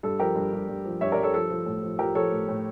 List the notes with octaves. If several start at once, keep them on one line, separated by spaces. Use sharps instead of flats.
G2 A4
F3 G4 A#4
G2
G2
G2
F3
G2 C#5 E5
A#4 D5
G2
A4 C#5
F3 A4
F3
A2
F3
F3 G4 A#4
F3 A4 C#5
A2
A2